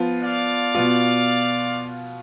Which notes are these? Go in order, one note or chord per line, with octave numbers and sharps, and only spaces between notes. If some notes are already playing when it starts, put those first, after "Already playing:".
Already playing: F3 B3 F4
D5 F5
B2 B3 F4